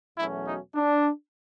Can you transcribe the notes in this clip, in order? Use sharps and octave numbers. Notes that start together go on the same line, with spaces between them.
E2 B2 F#3 A3 C#4 E4
D#4
D4